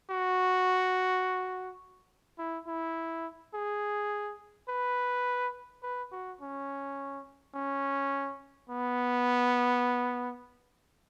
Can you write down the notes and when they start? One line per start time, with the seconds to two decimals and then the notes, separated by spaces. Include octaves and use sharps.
0.10 F#4
2.38 E4
2.67 E4
3.54 G#4
4.69 B4
5.83 B4
6.12 F#4
6.41 C#4
7.54 C#4
8.70 B3